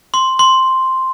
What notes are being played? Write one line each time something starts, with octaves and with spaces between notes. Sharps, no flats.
C6
C6